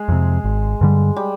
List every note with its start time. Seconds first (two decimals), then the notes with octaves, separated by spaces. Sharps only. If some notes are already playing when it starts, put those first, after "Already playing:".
Already playing: G#3
0.09 F2 C3
0.44 G#1
0.81 G2 D3 G3
1.17 G3